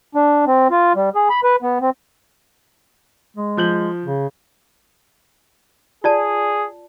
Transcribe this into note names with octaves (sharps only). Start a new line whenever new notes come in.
D4
C4
F4
G3
G#4
B5
B4
B3
C4
G#3
F3 G6 F#7
C#3
F4 G#4 D5 A5